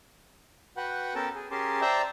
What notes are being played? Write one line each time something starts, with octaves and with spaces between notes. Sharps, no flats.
F#4 B4 F#5 G5
B3 C#4 A4 A#4 G5 A5
G#4
C#4 G4 G#4 A#4 A5 C6
C5 D5 E5 G5 A5 A#5